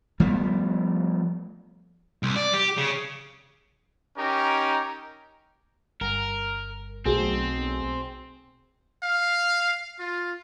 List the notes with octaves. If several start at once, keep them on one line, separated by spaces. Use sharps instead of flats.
F3 G3 A3 B3
C2
D5
G4
C#3
C#4 D#4 G4 A#4
G1 A#4
B1 B2 A3 C4 G#4
F5
F4